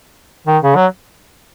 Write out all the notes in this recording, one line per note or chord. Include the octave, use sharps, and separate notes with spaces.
D#3
C#3
F#3